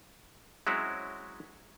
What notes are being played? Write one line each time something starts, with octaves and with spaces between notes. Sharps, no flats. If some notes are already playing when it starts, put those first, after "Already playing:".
F#3 G#3 C4 C#4 E4 F#4